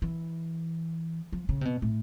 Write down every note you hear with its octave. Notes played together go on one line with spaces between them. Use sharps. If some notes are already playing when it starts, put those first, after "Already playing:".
E3
F3
C#3
C3
B2
A2